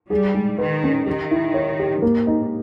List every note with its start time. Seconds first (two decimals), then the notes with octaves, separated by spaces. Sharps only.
0.10 G3 G#4
0.34 G#3
0.58 D#3 B4
0.83 C#4
1.06 D#3 G4
1.31 E4
1.54 C#5
1.79 G4
2.02 G#2 A#3
2.27 D#4